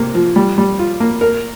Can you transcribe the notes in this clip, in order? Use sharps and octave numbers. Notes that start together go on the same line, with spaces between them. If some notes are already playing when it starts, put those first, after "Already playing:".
Already playing: C3 A#3
F3
G3
G3
F4
A#3
A#4